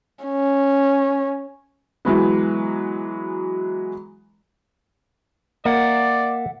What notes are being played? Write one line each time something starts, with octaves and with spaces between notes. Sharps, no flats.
C#4
E3 F#3 G#3 B3
A#3 D5 E5 F#5